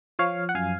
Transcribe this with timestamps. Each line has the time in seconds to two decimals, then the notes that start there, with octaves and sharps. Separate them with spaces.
0.19 F3 C#5 F5
0.49 F#5
0.55 F#2 F5 G#5